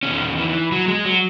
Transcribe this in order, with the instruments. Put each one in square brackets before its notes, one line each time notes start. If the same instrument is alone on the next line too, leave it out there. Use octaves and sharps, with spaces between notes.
[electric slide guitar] E2 D#3 C#4
E3
F#3
G#3
F#3